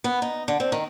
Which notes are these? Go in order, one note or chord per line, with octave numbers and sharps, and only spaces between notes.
B3
D#4
D3
C4
D#3